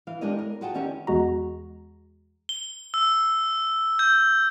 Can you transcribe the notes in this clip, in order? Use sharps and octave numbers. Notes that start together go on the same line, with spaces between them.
E3 F5
G#3 D4 G4 A#4 C#5 D#5
A#4
F4 F#4 G#4 F#5 G5 A5
E2 D#3 C#4 G4 C#5 E5
E2 G#3 F#4 A#5
G7
E6
G6